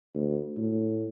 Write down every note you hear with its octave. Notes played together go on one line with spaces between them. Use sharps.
D2
A2